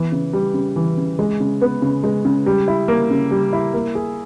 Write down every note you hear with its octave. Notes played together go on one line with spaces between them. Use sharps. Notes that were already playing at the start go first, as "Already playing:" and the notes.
Already playing: E3 B3
C#3
G3
C#3
E3
C#3
G#3
C#3
B3
C#3
G#3
C#3
G3
E4
A#3
C#3
G3
E4
A#3
G#4